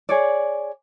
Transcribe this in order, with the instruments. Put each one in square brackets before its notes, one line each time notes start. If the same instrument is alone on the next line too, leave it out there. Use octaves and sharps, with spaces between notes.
[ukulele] G#4 C#5 D5